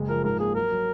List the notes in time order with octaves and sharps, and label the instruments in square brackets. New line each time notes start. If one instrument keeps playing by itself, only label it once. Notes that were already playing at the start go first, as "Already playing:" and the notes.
Already playing: [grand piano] F#1 G#3
[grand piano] F3 [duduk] A#4
[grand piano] G#2 [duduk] A#4
[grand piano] A#3 [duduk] G#4
[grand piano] F#3 [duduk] A#4
[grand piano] F#3